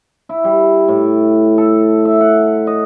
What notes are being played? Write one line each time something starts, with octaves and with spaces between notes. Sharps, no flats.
E4
G3
A2
A4
E5
F#5
D#5